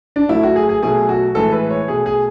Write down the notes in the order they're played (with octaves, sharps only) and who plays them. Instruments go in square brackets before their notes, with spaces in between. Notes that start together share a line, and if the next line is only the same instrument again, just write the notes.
[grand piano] D4
A2 F#3 A3 E4
F#4
G#4
G#4
B2 F#3 A3 G#4
F#4
A2 E3 G#3 A4
B4
C#5
B2 A3 G#4
G#4